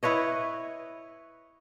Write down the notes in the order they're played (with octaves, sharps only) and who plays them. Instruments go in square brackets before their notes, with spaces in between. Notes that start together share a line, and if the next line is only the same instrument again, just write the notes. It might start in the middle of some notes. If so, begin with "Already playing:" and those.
[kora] E4 B4 C#5 D#5